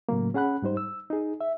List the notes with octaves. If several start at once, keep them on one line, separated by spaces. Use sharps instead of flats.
A2 C#3 F#3 A#3
C#4 G#4 F#5 B5 F#6
G#2 G3 D#4 C5
E6
D#4 G#4
E5